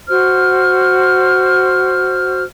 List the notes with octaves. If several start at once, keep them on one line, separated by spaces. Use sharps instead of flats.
F#4 C5 F6